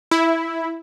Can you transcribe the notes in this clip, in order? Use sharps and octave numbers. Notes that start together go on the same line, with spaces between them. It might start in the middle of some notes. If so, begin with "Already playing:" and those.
E4